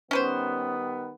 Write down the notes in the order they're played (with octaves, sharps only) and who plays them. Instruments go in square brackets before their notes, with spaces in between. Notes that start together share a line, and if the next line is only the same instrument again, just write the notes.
[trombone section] D#3 G3 B3 [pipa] C#4 B4 C5